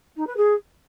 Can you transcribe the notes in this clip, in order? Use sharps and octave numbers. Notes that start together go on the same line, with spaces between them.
D#4
B4
G#4